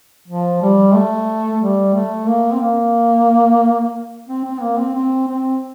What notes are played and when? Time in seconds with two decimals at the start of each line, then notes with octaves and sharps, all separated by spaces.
0.28 F3
0.62 G3
0.95 A3
1.61 G3
1.94 A3
2.27 A#3
2.53 C4
2.61 A#3
4.28 C4
4.44 C4
4.61 A#3
4.77 C4
4.94 C4
5.28 C4